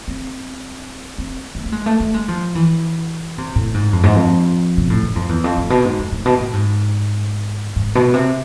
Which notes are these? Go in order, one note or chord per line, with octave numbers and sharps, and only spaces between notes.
C4
C4
A3
A3
G#3
A3
A3
G#3
F3
E3
C3
A2
G#2
F2
G#2
F2
B2
A2
G#2
F2
E2
F2
A2
B2
G#2
F2
A2
B2
A2
G#2
G#2
B2
C3